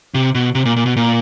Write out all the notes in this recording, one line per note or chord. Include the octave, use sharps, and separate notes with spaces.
C3
B2
C3
A#2
A#2
B2
A#2